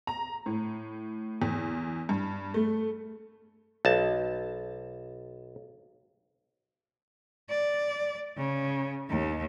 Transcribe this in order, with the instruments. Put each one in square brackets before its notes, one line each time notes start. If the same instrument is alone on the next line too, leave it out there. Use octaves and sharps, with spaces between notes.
[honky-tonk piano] A#5
A2
E2
G2
A3
[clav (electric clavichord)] B1 A5
[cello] D5
C#3
D#2